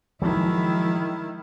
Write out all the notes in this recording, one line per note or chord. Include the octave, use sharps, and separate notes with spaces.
D#3 F3 F#3 G#3 E4